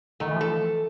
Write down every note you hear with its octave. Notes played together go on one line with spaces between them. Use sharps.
D#3 A3
E3
F3 A4